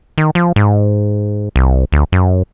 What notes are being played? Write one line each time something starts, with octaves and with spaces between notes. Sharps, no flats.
D#3
F3
G#2
C2
D2
F#2